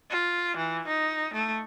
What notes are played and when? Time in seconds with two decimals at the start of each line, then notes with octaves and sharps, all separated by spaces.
0.11 F4
0.57 E3
0.88 D#4
1.34 A3